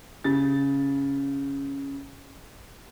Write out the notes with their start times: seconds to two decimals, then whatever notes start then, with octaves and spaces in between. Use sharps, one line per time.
0.24 C#3 A6